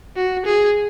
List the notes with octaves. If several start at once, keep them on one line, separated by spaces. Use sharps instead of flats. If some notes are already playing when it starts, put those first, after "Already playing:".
F#4
G#4